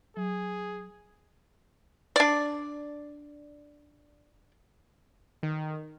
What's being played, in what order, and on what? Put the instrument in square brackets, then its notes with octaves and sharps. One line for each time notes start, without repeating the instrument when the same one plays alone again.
[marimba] F#3 [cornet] G#4
[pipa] D4 D5
[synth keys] D#3